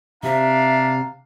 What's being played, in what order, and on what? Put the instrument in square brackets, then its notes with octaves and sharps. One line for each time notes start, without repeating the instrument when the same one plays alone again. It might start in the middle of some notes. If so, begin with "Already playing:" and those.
[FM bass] C3 [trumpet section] D4 F5 [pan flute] E5 [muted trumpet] A#5